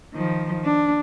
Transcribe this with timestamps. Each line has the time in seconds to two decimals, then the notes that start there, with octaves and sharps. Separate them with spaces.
0.13 D#3 F3
0.64 D4